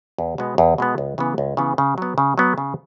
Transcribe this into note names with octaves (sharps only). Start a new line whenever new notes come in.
E2
B2 G#3 B3
E2
B2 G#3 B3
C#2
C#3 E3 B3
C#2
C#3 E3 B3
C#3
F#3 B3
C#3
F#3 B3
C#3